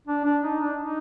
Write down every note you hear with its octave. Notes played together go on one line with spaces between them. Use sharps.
D4
D4
D#4
D4
D#4